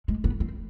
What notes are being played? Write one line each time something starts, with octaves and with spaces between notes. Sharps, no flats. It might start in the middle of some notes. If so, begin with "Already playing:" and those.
G#3
B3
C4